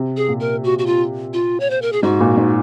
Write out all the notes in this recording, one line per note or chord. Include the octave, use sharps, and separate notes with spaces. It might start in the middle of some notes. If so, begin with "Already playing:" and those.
Already playing: C3
G#4
A#2
A#4
F#4
F#4
F4
F4
C#5
C5
A#4
G#4
G#2 F#4
A#2
G#2